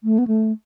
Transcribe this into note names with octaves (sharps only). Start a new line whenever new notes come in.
A3
B3
A3